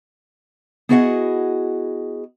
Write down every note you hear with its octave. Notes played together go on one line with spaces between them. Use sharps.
B3 E4 F#4 G#4 D#5 F#5